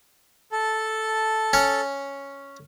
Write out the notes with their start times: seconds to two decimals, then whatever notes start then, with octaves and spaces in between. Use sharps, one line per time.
0.52 A4 A5
1.53 C#4 C#5